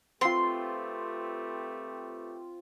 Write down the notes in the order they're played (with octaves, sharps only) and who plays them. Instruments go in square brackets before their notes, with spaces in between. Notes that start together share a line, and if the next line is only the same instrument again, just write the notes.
[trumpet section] A3 G4 B4 [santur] C4 F4 [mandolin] C6